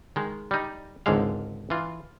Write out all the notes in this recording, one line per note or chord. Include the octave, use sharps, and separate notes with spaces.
D#3 G#3
G3 D#4
G#1 C#2 G#2 D3 G#3 F5
E3 F4